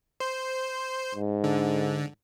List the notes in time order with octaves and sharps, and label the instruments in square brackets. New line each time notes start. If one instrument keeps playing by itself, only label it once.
[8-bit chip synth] C5
[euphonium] G#2
[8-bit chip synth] D3